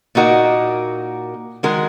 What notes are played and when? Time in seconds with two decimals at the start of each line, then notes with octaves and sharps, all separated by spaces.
0.15 A#2 A#3 D#4 F#4 A#4
1.63 D#3 G#3 F#4 A#4